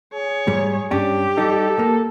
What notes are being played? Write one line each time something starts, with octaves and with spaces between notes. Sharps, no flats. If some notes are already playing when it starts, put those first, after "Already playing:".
G#4 C#5
G#2 G3
G2 C#4 D4 G4
G3 D#4 A4
A#3